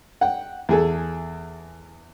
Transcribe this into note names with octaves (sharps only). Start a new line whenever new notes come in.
F#5 G5
E2 G#4 A4